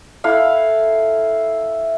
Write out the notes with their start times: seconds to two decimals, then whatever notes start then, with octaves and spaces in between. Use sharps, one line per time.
0.24 E4 A4 F5 F#5